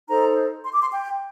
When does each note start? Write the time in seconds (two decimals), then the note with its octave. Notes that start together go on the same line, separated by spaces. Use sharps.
0.07 D#4 A4 C5 A#5
0.64 C6
0.73 D6
0.82 C6
0.92 G5